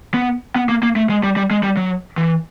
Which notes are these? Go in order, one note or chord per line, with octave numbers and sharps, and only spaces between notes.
B3
B3
A#3
A#3
A3
G#3
G3
G3
G#3
G3
F#3
E3